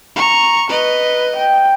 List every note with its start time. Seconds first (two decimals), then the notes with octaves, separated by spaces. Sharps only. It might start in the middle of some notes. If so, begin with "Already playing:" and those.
0.16 A#5 C#6
0.70 B4 D#5
1.36 G5